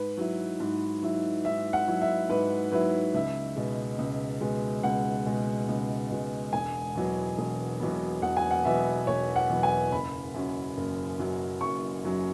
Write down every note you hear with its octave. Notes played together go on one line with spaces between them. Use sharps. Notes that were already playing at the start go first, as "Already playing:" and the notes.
Already playing: G#2 B4
F#3 E4
G#2
F#3 E4
G#2 E5
F#5
F#3 E4
E5
G#2 B4
F#3 E4 B4
C#2 E5
B2 G#3
C#2
B2 G#3
C#2 F#5
B2 G#3
C#2
B2 G#3
E1 G#5
E2 B2 F#3 B3
E1
E2 B2 F#3 B3
E1 F#5
G#5
F#5
E2 B2 F#3 B3 E5
E1 C#5
F#5
E2 B2 F#3 B3
G#5
F#1 B5
F#2 F#3 C#4
F#1
F#2 F#3 C#4
F#1 C#6
F#2 F#3 C#4